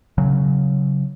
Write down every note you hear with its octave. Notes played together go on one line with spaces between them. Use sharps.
C#3 F#3